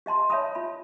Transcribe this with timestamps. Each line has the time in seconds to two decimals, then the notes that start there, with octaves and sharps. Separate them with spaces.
0.06 G4 D#5 A5 C6
0.30 C#5 E5 A5 B5 D#6
0.55 F4 B5